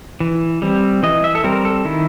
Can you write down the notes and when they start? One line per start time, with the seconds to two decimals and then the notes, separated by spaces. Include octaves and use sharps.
0.20 E3
0.62 G3 C4
1.03 E3 D#5
1.24 E5
1.35 A4
1.44 G3 C4 A#4
1.65 A4
1.85 D#3 E4